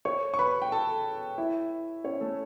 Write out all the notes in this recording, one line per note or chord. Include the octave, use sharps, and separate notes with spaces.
C#5 C#6
C#6
B4 B5
G5
A4 A5
E4 E5
C#4 C#5
A3 A4